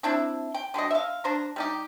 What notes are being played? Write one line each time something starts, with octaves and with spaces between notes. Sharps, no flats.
C4 D4 E4
G5
D3 G3 F#4 D#5
E5 F5
D4 C5 A#5
G3 D#4 G4